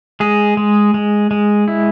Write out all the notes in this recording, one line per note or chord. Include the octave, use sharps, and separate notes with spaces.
G#3 G#4
G#3
G#3
G#3
E4